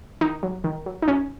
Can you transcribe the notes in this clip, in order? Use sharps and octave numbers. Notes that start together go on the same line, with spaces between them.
D#3 D#4
F#3
D#3
F#3
D#4
F#2 C#4